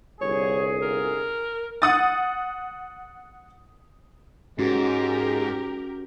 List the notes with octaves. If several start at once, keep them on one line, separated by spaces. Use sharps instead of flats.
G1 C2 G#4 C#5
A#4
F#5 D#6 A6
G#2 G#3 C#4 F#4 G4 A#4